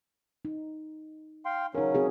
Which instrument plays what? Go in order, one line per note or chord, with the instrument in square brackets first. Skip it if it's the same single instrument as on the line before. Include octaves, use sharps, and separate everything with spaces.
[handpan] D#4
[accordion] F5 G5 C6
[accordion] C#3 F#3 C#4 [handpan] D#4 A#4
[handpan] C4 F#4 G#4